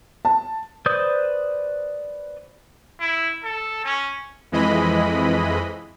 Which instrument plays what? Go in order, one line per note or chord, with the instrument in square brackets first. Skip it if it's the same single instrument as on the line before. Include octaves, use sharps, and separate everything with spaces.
[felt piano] A5
[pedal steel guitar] B4 C5 D5 D#6 G6
[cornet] E4
A4
C#4
[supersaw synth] F2 E3 G#3 D#5 B5